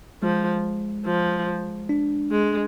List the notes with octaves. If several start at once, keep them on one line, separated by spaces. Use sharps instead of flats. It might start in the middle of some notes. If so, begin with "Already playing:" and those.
F3 G#3
F3
D4
G#3